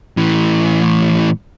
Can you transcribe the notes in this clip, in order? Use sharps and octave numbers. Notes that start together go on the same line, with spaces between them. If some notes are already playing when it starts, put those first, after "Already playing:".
A2 E3